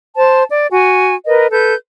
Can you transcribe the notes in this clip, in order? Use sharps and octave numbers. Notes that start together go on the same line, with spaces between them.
C5 A5
D5
F#4 G#5
A#4 B4 D#5
A4 B4 G6